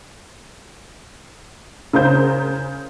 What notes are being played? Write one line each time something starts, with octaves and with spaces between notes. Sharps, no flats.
C#3 A#4 C5 G6